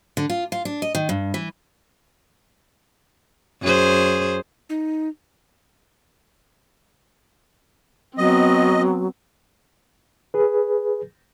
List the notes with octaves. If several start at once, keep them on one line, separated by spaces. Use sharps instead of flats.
D3
F4
F4
D4
D#5
D#3
G2
E3
F#2 G#4 C5
D#4
F#3 B3 C4 D#5
G#4 B4